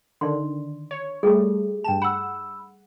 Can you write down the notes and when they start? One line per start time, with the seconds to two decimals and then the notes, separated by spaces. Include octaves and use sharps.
0.21 D3 D#3 D5 C6
0.91 C#5
1.23 G3 A3 G#4 A4
1.84 G2 G5 A5 E7
2.02 F#5 B5 E6